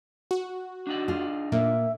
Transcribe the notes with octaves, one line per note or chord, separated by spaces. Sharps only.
F#4
D4 D#4 F#5
F4 G#4
A#2 A#3 E5